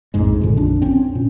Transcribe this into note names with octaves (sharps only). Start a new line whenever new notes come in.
A#1 F2 G#2 G#3
A#2 D3
A#1 F2 D4
C4 C#4
A#2